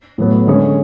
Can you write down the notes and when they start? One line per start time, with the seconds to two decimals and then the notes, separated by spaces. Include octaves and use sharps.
0.18 A2 F#3 B3
0.46 D3 G#3 C#4 G#4 C#5